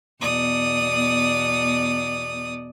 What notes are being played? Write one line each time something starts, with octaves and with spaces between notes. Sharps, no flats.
E2 B2 D5 D#6